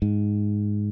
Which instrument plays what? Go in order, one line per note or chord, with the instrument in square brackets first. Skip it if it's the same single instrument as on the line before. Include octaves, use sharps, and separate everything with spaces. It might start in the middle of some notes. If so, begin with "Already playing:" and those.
[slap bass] G#2